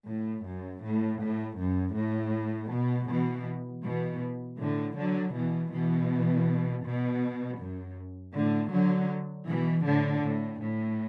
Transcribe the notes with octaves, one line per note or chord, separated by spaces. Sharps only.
A2
F#2
A2
A2
F#2
A2
B2
B2 E3
B2 E3
A2 D3
D3 F#3
B2 E3
B2 E3
B2
F#2
A2 D3
D3 F#3
B2 E3
A2 D3
A2
A2